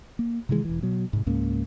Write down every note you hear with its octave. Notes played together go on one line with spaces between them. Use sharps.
A#3
C3 D#3 E3 G#3
E1 E3
B2 F#3
G#2 C3
C#2 G#2 A#3 C#4